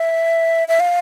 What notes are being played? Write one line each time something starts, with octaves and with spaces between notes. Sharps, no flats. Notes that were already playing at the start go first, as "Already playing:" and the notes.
Already playing: E5
E5
F5